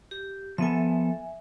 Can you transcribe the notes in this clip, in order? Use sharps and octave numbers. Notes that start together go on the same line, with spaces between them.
G4
F3 B3 A4 E5 G#5